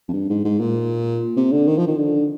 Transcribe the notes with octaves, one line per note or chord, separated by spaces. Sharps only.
F2
G2
G#2
G#2
A#2
C3
D3
D#3
F3
D#3
D3